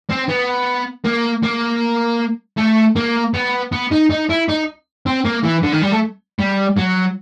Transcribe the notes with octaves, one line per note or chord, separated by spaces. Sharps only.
C4
B3
A#3
A#3
A3
A#3
B3
B3
D#4
D#4
E4
D#4
C4
A#3
E3
D3
D#3
G3
A3
G3
F#3